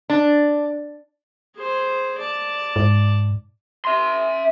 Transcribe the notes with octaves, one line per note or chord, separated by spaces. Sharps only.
D4
G#4 C5
D5 A5
G#2
E5 C6